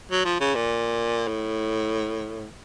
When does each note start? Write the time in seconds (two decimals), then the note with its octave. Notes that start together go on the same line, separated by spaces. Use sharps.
0.11 F#3
0.25 F3
0.40 C#3
0.55 A#2
1.28 A2